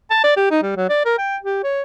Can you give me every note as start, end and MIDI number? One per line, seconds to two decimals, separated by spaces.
0.11 0.20 81
0.24 0.33 74
0.37 0.47 67
0.51 0.62 63
0.63 0.73 55
0.76 0.86 54
0.89 1.04 74
1.05 1.16 70
1.18 1.37 79
1.42 1.60 67
1.63 1.83 73